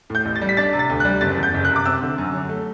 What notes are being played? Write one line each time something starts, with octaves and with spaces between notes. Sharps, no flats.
A2 G6
A1
A6
G3
B6
D4 A6
C3
A6
D2
F#6
G3
F#1 A6
E2
G6
F#1
F#6
C3
D6
C4 E6
D3
F#2
F#3
A3